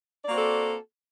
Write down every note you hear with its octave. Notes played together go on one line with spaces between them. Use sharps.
A#3 C4 F#4 A4 D5